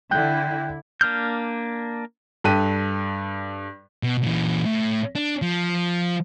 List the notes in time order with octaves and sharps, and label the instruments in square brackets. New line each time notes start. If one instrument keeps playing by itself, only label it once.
[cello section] D3 E4 [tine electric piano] G5 F#6 G6
[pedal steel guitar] A#3 D4 F6 G6
[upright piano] G2 A4 G5 F#6 B6 D#7
[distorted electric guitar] B2
A#2 E3
A2
D4
F3